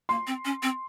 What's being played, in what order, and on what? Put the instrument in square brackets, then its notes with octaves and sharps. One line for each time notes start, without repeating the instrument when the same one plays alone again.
[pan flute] A#3 [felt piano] C6
[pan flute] C4
C#4
C4